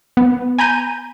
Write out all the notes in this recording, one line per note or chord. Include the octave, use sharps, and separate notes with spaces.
B3
G#5 A#5 B5 G6 D#7